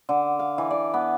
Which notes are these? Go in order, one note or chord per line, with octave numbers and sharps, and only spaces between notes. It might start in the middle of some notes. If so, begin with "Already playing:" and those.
D3
F5
E3
D5
B3